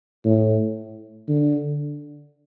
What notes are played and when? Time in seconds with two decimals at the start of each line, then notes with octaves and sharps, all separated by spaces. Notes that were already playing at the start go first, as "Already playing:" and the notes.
0.25 A2
1.28 D3